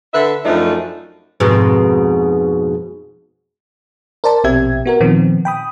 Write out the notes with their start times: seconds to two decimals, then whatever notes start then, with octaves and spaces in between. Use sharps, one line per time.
0.13 D3 B4 E5
0.45 F#2 F3 A3 D4 D#4
1.40 F2 G#2 B2
4.24 A#4 C5 D5 A5
4.44 A#1 B2 C4 G4 E5 G#6
4.86 B3 F#4 A#4
5.01 A#2 D#3 F3 B3 C4
5.45 G5 B5 D#6